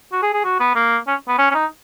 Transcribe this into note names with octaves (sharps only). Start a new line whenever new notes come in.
F#4
G#4
G#4
F#4
B3
A#3
C#4
B3
C#4
C#4
D#4